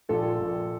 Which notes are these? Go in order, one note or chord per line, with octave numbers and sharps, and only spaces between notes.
A#1 F4 A4
A#1